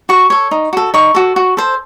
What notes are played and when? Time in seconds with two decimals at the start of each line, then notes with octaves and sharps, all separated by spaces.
0.09 F#4 C#6
0.30 A4 C#5
0.51 D#4
0.73 F#4 A4
0.94 D#4 C#6
1.15 F#4 A4
1.36 F#4
1.57 A4 C5